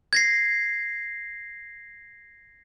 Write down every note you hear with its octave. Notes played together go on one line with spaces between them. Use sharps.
G#6 A#6 C7